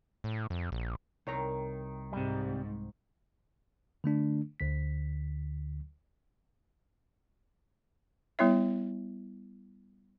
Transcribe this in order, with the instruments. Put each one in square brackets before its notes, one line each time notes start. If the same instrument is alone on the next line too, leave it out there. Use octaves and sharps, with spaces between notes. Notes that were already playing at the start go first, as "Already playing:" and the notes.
[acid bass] A2
F2
A#1
[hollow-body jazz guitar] C2 C#5 A#5 [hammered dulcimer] D#3
[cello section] G#2 [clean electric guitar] C3 G3
[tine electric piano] D3 A3 D4
D2 D3 B6
[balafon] G3 B3 E4 C#5 E5